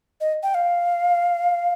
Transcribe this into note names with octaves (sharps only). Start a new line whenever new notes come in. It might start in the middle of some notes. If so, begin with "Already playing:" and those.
D#5
G5
F5